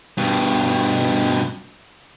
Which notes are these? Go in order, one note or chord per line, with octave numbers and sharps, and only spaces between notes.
G2 B2